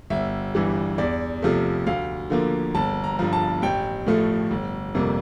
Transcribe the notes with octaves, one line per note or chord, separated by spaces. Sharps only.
G1 E5
G2 E3 G3
E2 D5
C3 F3 A3
D2 F5
D3 F3 A#3
G1 A5
A#5
G2 F3
A5
A1 G5
A2 F3 A3
G1
F2 C3 G3 A#3